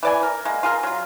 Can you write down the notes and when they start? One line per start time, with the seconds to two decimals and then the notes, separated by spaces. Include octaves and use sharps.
0.03 E3 D5 G#5
0.23 A#4
0.45 G#3 A#3
0.63 F4 G#4 A#4
0.83 F#3 F4